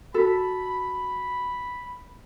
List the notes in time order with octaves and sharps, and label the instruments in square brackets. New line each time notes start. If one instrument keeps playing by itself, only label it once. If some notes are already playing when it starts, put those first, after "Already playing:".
[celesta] F#4 B6 [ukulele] A4 [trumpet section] B5